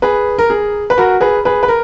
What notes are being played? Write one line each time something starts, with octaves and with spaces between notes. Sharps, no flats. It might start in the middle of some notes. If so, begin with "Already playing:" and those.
G#4 B4
A#4
G#4
B4
F#4 A#4
G#4 B4
G#4 B4
B4
A#4